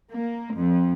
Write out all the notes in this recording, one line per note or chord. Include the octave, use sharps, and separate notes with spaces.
A#3
F2